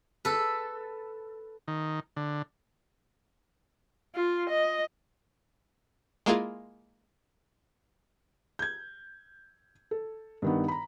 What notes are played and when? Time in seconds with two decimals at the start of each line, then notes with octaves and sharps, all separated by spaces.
0.25 A4 B4
1.68 D#3
2.16 D3
4.15 F4
4.49 D#5
6.26 G#3 A#3 E4 F4 G#4
8.59 G6 G#6
9.91 A4
10.42 G2 D#3 B3
10.68 A#5 B5